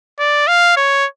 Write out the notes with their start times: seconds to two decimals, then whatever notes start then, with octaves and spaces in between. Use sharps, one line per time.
0.19 D5
0.48 F5
0.77 C#5